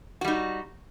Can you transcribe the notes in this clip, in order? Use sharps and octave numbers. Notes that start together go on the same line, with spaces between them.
G3 D#4 F#4